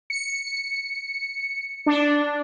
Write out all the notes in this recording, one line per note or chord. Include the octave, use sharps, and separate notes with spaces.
C#7
D4